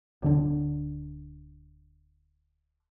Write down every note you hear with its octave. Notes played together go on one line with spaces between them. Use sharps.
D1 D3 D4